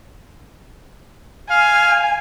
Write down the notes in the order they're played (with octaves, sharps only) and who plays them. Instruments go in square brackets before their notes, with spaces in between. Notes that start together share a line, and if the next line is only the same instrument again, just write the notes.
[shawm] F5 [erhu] G#5